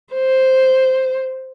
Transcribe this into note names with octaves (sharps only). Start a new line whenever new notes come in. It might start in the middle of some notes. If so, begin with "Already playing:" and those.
C5